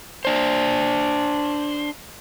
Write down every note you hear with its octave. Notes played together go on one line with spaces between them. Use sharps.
D4 C5